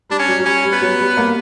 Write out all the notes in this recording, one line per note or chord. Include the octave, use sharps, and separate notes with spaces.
G3 D4
C#4
F#3
F#3
G3 C#4
G3
B3
F#3
G3
A#3